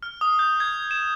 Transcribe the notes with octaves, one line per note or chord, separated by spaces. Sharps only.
F6
D#6
G6
G#6
E7